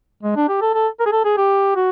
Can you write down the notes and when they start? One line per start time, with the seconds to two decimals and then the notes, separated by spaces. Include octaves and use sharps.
0.23 G#3
0.36 D4
0.48 G4
0.61 A4
0.74 A4
1.00 A#4
1.06 G#4
1.12 A4
1.25 G#4
1.37 G4
1.75 F#4